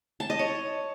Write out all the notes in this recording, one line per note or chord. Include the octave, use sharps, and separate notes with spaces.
A5
D#5
C#5